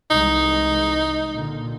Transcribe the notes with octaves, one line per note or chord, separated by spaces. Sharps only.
C2 E3 G#3 D#4
A#2 D3